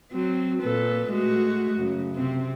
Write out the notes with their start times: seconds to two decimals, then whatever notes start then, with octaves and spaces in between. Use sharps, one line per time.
0.12 F#3 C4
0.63 A#2 A4 B4
1.10 G#3 A3 F#4
1.79 F#2 C#3
2.16 C3 C4